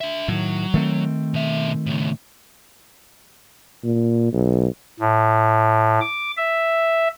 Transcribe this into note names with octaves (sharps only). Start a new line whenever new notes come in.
D4 E5
A2 D#3 F#3
D#3 A3 C4
B2 E5
A2 C#3
A#2
B1
A2
D6
E5